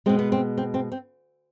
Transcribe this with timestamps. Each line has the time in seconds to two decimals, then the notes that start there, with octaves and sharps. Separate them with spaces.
0.06 B2 G#3 C4
0.19 B3
0.32 C4
0.57 C4
0.74 C4
0.92 C4